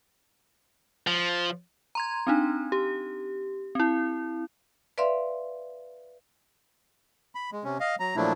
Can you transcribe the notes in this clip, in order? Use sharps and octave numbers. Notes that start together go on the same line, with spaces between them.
F3
A#5 C6 G#6
C4 D4 D#4
G4
C4 E4
B4 D5 E5 F5 C6
B5
G#3
C3 C#4
D#5 F5
F#3 A#5
A#2 F3 F#3 A3 D4 E4